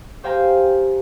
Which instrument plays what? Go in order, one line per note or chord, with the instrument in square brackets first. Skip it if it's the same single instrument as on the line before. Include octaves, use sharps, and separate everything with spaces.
[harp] G4 C5 F5 G5 G#5 A#5